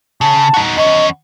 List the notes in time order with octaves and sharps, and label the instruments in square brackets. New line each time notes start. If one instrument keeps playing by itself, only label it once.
[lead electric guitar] C#3 [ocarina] A5
[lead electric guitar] D#4 F#4
[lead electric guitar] E2 C#4 [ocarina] D#5